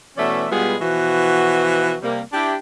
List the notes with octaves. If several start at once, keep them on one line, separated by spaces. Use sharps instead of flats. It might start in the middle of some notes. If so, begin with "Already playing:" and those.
B2 E3 A3 C#4 D5 E5
B2 G3 G#3 B3 F4 G#4
B2 E3 F3 F#4
C3 G3 A#3
D4 E4 G4